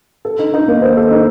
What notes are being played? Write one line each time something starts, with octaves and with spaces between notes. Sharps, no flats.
A4
D#4
D#4
A#3
C5
A4
D#4